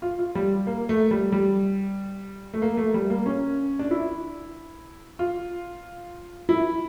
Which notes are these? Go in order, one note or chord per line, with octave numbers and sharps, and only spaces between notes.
F4
F4
G3
A#3
A3
G3
G3
A3
A#3
A3
G3
A#3
C#4
D4
E4
F4
E4